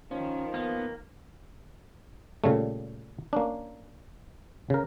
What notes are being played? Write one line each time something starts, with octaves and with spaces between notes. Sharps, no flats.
D#3 F3 C#4
A#3 B3
A#2 C#3 G3 A3
A#3 C#4 D4
C#3 A#4